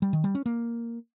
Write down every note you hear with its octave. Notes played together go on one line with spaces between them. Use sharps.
G3
D#3
G3
C#4
A#3